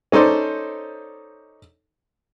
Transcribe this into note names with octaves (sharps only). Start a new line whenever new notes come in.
C#4 D#4 A4 C5 D5